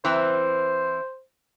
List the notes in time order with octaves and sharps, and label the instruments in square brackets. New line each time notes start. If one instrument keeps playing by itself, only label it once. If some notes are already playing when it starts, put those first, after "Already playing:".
[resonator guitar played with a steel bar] E3 C4 [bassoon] C5